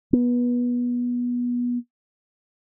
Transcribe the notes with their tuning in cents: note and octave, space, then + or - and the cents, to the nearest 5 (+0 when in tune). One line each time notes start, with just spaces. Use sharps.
B3 -20